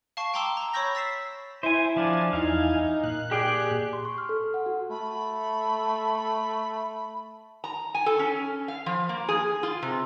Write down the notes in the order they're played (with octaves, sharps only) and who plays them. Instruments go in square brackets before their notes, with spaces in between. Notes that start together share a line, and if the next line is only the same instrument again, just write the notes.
[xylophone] F5 A5 C#6
G5 A5 A#5 C6 D6 E6
A#5
C#5 B5 C#6 E6 G6 A#6
E6 A6 B6 C7 E7
[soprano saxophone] E4 [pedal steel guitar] C5 G#5
[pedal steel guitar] F3 D4 [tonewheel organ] F5 G#5 A5
[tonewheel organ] E2 E4 G#5 [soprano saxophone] D#4 [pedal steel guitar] F5
[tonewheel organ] A#2 F#6
[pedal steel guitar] G4 D5 G5 [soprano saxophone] G#4
[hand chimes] C6
C#6
F6
A4
F#5
F#4
[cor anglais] A3 [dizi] B5
[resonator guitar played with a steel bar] A#5
G#5
A4
C#4
F5
F3
A#3
G#4
F4
C3